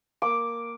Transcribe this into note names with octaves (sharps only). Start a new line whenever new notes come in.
A#3 D6